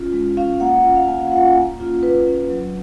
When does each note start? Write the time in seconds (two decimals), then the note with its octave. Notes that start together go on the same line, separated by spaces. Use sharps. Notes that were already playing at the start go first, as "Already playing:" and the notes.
Already playing: C#4 F4
0.13 G#3
0.37 C#4 F4 F5
0.60 A#3 F#5
0.84 C#4 F4
0.96 F5
1.08 A#3 G#5
1.21 F5
1.32 C#4 F4 F#5
1.56 A#3
1.79 C#4 F4
2.03 A#3 B4
2.26 C#4 F4
2.50 F#3